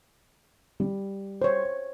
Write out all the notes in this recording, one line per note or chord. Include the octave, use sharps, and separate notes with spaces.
G3
C5 C#5